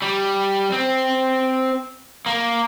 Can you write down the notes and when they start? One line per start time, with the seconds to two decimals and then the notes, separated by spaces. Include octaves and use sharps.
0.02 G3
0.72 C4
2.26 A#3